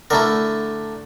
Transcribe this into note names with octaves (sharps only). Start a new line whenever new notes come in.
D3 A3 E4 A#4